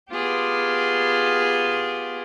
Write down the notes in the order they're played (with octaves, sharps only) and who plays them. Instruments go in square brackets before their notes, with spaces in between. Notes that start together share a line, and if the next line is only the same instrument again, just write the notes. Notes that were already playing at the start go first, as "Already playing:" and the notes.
[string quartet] B3 F4 G4 G#4